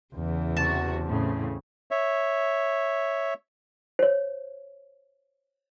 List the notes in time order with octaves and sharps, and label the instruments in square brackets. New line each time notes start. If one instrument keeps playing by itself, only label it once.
[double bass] E2 [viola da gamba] C#3 E3
[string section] C3 F#4 [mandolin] A5
[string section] A2 C#3 C4
[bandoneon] C#5 E5
[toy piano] C5 C#5